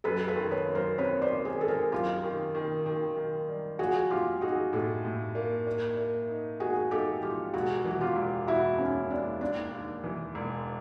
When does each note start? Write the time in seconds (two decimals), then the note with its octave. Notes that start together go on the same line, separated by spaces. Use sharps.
0.04 F#2 A4 B4
0.28 A4 B4
0.35 D#3
0.51 B4 C#5
0.67 F#2
0.75 A#4 C5
0.98 C4 B4 C#5
1.21 C5 D5
1.30 D#3
1.45 G#4 A#4
1.61 D#3 A4
1.68 G#4 A#4
1.92 F#2 F4 G4
2.24 D#3
2.55 D#3
2.86 D#3
3.16 D#3
3.48 G3
3.79 F3 F#4 G#4
4.10 F3 F4 G4
4.41 D#4 F#4 G#4
4.73 A2 G4 A4
5.04 A2
5.35 A#3
5.67 A#3
5.97 A#3
6.29 D#4
6.60 D#4 F#4 G#4
6.91 D#4 G4 A4
7.23 F3 F4 G4
7.54 E1 F#4 G#4
7.85 E3
7.90 F#4
8.00 F4 G4
8.16 E1
8.47 E1 E4 F#4
8.78 D#2 C#4
9.10 D#2 D4
9.41 D#2 D4
9.73 D#2
10.04 E3
10.35 E1